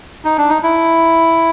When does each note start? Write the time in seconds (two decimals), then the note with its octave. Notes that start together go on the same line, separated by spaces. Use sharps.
0.25 D#4
0.38 D4
0.50 D#4
0.63 E4